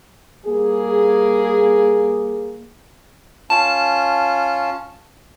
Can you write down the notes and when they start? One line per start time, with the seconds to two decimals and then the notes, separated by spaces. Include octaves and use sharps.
0.45 G3 A#3 G#4
3.50 C#4 F4 A5